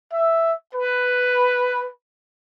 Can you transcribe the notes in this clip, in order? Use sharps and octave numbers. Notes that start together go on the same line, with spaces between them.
E5
B4